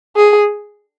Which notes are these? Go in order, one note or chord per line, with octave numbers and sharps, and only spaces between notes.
G#4